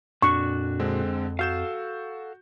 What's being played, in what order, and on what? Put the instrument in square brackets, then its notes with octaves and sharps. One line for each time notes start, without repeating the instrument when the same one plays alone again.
[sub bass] F2 [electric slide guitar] A#2 D4 F#4 [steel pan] C#6
[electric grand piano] D3 G#3 C4
[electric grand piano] F#4 G6 E7 [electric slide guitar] A4 F5